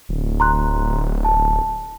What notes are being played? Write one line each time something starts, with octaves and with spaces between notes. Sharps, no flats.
D1
A#5 C6 F#6
A5